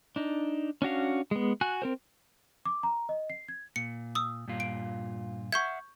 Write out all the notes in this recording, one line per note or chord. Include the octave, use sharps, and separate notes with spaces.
D4 D#4
C#4 D4 F#4 F5
G#3 B3
F#4 G#5 F#6
C4 A#4 C5
D6
A#5
D#5
C7
G#6
A#2 C#7
D#6 E6
G2 A#2 F4
D7
E5 F#5 C#6 G6 G#6